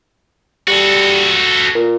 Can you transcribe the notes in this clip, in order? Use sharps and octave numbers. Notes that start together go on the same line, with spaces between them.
G3 F#4 A4
A#2